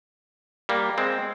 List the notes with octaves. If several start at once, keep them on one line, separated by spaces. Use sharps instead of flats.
G3 A#3
G#3 C4